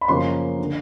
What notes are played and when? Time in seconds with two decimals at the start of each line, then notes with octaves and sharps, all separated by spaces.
0.01 B5
0.08 F#2 C#3 F3 A#3 C#4 C6
0.59 D3